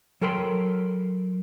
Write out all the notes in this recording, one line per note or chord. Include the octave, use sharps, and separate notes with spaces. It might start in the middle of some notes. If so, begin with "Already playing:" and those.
F#3 A4 A#4 G5 B5 C6